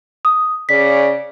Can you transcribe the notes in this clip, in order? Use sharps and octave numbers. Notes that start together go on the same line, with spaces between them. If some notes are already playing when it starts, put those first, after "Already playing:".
D#6
C#3 D5 B6